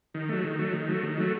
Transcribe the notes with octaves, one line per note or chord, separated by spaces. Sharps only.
D#3
F#3 A3
D#3
F#3 A3
D#3
F#3 A3
D#3
F#3 A3